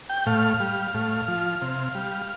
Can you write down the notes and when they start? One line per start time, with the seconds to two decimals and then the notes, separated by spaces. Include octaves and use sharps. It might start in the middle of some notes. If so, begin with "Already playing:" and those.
0.09 G5
0.26 A2 F5
0.60 G3
0.94 A2
1.28 F3
1.62 C3
1.95 G3